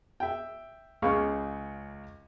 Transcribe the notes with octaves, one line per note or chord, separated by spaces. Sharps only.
E5 G5
C#2 C#3 F5 C#6